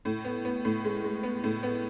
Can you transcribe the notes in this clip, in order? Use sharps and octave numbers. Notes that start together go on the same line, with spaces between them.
A2
B3
B3
A2
G#3
G#3
B3
A2
B3